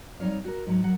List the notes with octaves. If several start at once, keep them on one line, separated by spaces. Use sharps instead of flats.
G3 C4 D#4 C#5 F5
F#4 A#4
G#2 F#3
F#3 A#4 F#5